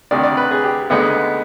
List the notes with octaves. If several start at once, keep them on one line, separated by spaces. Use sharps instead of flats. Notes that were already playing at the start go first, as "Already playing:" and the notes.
D2 C3 D#3 D5
D5
B4
G#4
G4
D2 D3 G#3 B3 D#4 B4